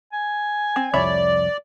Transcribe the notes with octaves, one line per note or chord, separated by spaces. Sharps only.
G#5
C4
C2 F2 C#5 D5 E5 B5